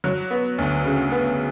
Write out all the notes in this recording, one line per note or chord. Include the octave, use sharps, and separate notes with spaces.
F#3
B3
D2
C#3
B3